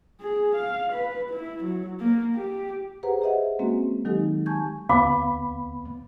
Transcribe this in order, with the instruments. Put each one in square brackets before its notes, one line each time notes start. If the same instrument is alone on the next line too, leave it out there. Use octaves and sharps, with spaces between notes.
[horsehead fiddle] G#4
F5
B4
E4
F#3
A#3
G4
[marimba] G4 G#4 B4 C5 F#5 A#5
G4 G#4 C5 D#5 E5 F#5
G#3 A#3 C4 C#4 F#4
D#3 F#3 G#3 D#4 G4 A4
G#5 A5 C#6 G6 G#6
[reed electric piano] D2 B3 B5 [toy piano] F5 D6